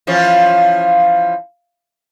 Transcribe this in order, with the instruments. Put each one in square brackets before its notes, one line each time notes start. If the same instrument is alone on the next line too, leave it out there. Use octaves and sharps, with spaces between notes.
[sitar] E3 F3 C#4